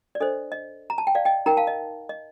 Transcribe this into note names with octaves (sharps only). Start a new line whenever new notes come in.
D5
D4 A4 C5 D#5
D#5
A#5
A5
G5
D5 F5
D#5 G5
D#4 A#4 G5 A#5
F5 A5
D#5
D#5